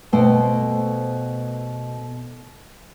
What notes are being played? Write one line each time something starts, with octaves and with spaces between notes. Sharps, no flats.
B2 A3 C5 G5